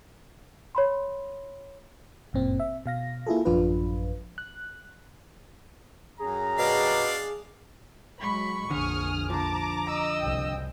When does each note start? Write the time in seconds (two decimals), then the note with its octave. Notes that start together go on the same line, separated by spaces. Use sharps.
0.75 C#5 B5 C6
2.33 G1 F#2 A#2 C4
2.60 E5
2.86 B2 F5 A#6
3.27 A#3 E4 F4 G#4 A4
3.45 A1 F#2 F3 D4 F4 B4
4.38 F#6
6.19 F#2 C#4 G#4 A#5
6.59 B2 D4 D5 F5
8.21 F#3 G#3 B5 C#6
8.71 A#1 F2 D3 G#4 D#6 F6
9.30 D3 F3 A5 A#5 D6
9.87 D#5 E6
10.20 F#1 C2 G5